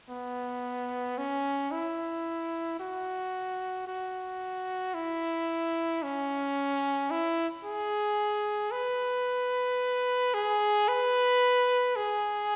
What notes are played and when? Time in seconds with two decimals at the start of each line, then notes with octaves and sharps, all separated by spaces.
0.10 B3
1.18 C#4
1.72 E4
2.80 F#4
3.88 F#4
4.94 E4
6.03 C#4
7.11 E4
7.65 G#4
8.72 B4
10.34 G#4
10.88 B4
11.96 G#4